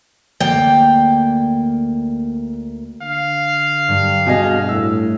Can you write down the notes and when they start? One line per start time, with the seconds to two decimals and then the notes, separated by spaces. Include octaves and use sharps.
0.41 D2 A#3 D5 G5
3.02 D3 F5
3.88 G2 G3
4.27 B2 G#4 D#5
4.69 A2 E5 E6